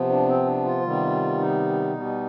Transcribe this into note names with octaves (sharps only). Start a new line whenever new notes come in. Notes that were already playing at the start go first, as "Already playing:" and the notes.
Already playing: C3 F3 B3
D4
C4
D4
F4
C3 D#3 G3 B3
D#4
B2 G3 B3